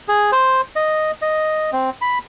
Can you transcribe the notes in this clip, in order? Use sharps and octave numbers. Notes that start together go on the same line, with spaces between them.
G#4
C5
D#5
D#5
C4
B5